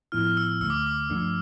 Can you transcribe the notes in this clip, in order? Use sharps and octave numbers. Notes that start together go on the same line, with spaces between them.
A2 F3 B3 E4 F6
E6
D2 D3 A3 E6
D6
D6
G2 F3 A3 D4